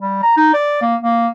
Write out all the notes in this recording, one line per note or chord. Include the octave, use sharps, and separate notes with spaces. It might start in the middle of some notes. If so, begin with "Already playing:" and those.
G3
A#5
D#4
D5
A#3
A#3